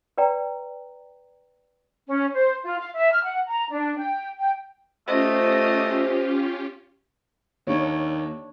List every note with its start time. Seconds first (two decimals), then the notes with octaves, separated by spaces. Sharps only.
0.18 B4 D5 G5 A#5
2.07 C#4
2.35 C5
2.64 F4
2.79 F5
2.95 E5
3.12 F6
3.24 F#5
3.47 A#5
3.70 D4
3.97 G5
4.38 G5
5.08 A3 C#4 F4 G4 C5 D#5
7.67 D#2 D4 C#5